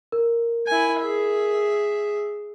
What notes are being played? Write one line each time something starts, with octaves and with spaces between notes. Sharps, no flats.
A#4
E4 G#5
G#4 E5